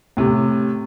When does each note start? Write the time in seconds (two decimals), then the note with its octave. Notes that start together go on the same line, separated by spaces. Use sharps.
0.17 A2 C3